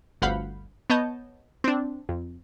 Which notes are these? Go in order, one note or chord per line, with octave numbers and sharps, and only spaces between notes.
G1 D2 F5 F#5 B5 G6
B3 C#5 D#5 A5 G6
C4 D4
F2